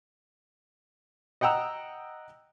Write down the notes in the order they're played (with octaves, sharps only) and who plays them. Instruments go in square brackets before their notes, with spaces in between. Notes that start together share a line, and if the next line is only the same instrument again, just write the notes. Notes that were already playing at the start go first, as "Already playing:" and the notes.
[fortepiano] D#5 F#5 G5 A#5 E6